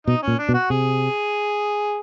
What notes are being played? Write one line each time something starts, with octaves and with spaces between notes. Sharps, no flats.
B2 D#4
A#2 C#4
D4
B2
F#4
C3 G#4